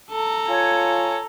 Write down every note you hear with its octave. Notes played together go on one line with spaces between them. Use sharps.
A4 A#5
F4 C#5 G#5